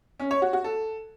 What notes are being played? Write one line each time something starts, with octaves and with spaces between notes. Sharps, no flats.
C#4
C#5
F#4
F#4
A4